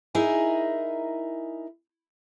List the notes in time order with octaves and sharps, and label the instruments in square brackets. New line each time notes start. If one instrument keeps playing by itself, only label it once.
[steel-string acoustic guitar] D#4 E4 G#4 A#4 G#5